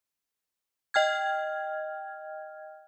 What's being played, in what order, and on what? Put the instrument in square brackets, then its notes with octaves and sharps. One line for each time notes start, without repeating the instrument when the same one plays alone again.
[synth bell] D#5 G5 F6 G#6